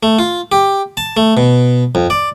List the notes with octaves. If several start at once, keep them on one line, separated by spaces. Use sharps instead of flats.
A3
F4
G4
A5
A3
B2
F2
D5